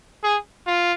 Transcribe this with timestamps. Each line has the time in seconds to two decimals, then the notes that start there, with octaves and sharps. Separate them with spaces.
0.24 G#4
0.67 F4